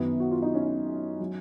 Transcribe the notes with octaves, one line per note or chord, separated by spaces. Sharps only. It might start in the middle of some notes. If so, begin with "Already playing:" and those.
Already playing: F#2 D#3 F#3 B3
F#4
F4
D#4
C#4
F#3